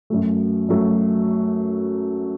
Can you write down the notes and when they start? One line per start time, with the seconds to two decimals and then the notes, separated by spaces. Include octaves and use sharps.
0.10 F#2 F#3 A3
0.68 F#2 F#3 A3